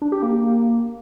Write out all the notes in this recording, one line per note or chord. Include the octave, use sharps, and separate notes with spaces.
D4
G4
A#3